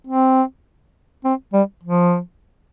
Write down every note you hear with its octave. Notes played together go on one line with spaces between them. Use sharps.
C4
C4
G3
F3